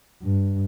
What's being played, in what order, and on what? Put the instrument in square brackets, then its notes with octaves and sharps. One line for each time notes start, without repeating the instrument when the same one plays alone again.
[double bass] G2